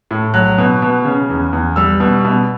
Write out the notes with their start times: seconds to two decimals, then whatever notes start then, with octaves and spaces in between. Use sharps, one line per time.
0.11 A2
0.34 F#3 F#6
0.58 B2
0.82 B2
1.05 C#3
1.30 E2
1.53 E2
1.76 G3 E6
2.00 B2
2.25 B2